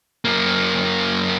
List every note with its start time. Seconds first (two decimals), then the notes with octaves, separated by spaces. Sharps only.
0.25 F#2 A#3